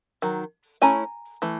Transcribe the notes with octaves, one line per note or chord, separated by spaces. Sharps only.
D#3 F#3
A3 C#4 E4 G#5 A#5
E3 A3